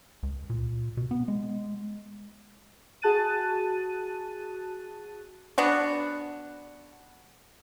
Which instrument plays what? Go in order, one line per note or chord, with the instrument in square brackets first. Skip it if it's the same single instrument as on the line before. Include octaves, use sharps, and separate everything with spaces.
[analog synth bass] C#2
A#2
B2
B3
G#3
[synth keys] F#4 G#4 A5 F#6 A6 D#7
[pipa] B3 D4 F#4